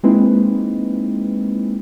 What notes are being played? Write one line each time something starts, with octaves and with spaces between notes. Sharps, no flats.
G#3 A#3 C4 D#4 E4 B4